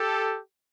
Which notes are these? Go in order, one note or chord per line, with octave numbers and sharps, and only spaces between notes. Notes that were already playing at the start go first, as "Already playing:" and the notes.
Already playing: G4 A4